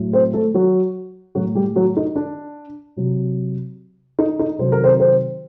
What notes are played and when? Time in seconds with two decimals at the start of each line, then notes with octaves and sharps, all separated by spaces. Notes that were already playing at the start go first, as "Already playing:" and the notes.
Already playing: A2 F#3
0.13 C4 C5
0.33 A3 A4
0.54 F#3 F#4
1.35 A2 F#3 F#4
1.55 G3 G4
1.76 F#3 F#4
1.97 D#4
2.16 D4
2.97 C3 F#3
4.19 D#4
4.39 D#4
4.59 C3 D#3 F#3 C5
4.72 A#4
4.84 C4 C5
5.00 C4 C5